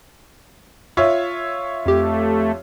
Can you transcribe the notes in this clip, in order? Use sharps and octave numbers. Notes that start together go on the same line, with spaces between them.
F4 C#5 E5
F2 A3 G4